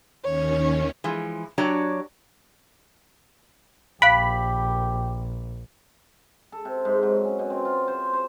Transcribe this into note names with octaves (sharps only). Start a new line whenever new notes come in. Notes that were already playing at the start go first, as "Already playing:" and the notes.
D#2 D#3 C#4 C#5
E3 F3 G#3
F#3 D4 F#4 G4 C#5 D5
A#1 G4 F5 B5 F#6 D7
A4
C3
G#2
F#3
C#4
B2
C4
F4
C5
C5